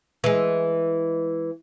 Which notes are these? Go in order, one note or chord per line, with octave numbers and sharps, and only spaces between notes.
E3 G#3